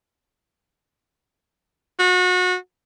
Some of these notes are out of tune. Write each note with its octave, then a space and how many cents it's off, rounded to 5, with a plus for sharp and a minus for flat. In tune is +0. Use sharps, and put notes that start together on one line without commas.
F#4 -30